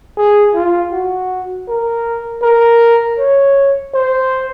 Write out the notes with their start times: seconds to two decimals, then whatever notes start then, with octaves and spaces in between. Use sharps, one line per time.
0.17 G#4
0.54 F4
0.92 F#4
1.68 A#4
2.42 A#4
3.19 C#5
3.94 C5